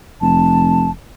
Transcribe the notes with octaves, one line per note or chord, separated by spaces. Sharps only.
F1 A5